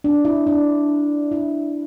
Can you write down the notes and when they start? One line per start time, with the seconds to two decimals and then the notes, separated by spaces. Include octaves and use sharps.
0.04 D4
0.25 E4
0.47 D4
1.32 E4